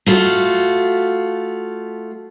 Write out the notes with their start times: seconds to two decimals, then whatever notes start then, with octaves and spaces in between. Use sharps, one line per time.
0.06 A3 F4 F#4